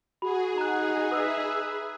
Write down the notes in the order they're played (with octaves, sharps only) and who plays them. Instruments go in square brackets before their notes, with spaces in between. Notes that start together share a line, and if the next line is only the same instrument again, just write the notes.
[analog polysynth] F#4 [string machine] G#4 [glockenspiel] B5
[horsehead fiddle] D#4 [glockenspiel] A#5 F#6
[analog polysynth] B4 E5 [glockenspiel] D#6 E6